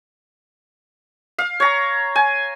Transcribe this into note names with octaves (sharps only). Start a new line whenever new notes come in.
F5
C#5 A#5
G#5